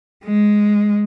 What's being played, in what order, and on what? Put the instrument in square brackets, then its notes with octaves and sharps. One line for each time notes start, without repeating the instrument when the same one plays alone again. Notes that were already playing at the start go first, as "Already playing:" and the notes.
[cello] G#3